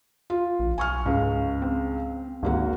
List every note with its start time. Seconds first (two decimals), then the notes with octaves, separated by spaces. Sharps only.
0.30 F4
0.59 A#1
0.78 B1 G#5 C#6 F6
1.06 C#2 G#2 C#3
1.62 C4
2.43 G#1 D2 A#3 F#4